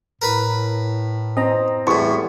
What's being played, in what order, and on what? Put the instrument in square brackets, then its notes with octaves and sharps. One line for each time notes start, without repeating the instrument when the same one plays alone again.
[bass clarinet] A2 [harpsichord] A#4 B4 B5
[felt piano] C4 [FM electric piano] D#5 A#5
[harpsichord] E2 A2 [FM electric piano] E3 G3 [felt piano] C#6